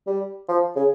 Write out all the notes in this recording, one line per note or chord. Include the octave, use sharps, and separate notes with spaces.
G3
F3
C#3